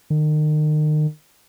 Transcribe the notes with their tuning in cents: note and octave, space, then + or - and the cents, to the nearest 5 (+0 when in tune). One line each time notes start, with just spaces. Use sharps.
D#3 -35